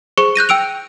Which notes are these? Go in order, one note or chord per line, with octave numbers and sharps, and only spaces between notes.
G#4 C5 C#6 C#7
F#6 G6 A#6 D#7
G5 E6 D7 F7